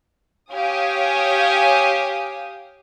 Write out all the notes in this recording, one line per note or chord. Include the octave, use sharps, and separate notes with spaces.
G4 C#5 F5 G#5 D#6